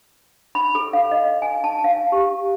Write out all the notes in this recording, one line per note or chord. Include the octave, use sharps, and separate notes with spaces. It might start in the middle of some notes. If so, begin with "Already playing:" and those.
B5
A4
F5
D#5
G#5
A5
F5
G4